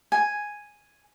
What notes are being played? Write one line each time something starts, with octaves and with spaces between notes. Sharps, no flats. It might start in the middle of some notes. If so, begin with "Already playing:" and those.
G#5